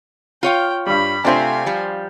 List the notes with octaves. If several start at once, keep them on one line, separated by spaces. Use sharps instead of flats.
F4 C#5 F5 G5
G2 G3 B5
C3 A3 C4 D4 F4 C5 F5 G#5
F3 G3